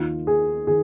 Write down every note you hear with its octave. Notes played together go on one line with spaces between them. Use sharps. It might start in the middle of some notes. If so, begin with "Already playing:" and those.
Already playing: D#2 D#3 A#3 D#4 F4
G#4
D#3 G#4